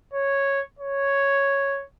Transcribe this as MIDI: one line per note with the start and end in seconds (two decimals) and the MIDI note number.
0.13 0.60 73
0.79 1.84 73